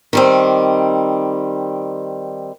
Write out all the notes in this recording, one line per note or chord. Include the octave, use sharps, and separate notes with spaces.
D#3 G3 C4